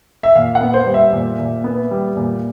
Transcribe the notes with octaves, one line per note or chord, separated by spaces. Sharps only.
E5
A#2 F5
F#5
B3
C5
G3
E5
A#2
A#2
B3
G3
A#2